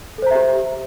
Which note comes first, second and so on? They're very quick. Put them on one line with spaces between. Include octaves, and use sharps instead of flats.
A4 C5 A#5 E5 G4